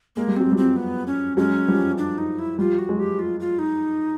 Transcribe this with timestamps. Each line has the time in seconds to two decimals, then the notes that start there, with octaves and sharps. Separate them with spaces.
0.16 G#3 A#3
0.28 G3
0.36 F#3 C4
0.52 F3 G3
0.57 C4
0.76 B3
1.07 C#4
1.37 F#3 G#3 C#4
1.68 F3 G3
1.98 D4
2.18 D#4
2.39 E4
2.58 F3 G3 F4
2.79 F#4
2.89 F#3 G#3
2.99 G4
3.19 F4
3.40 F4
3.59 D#4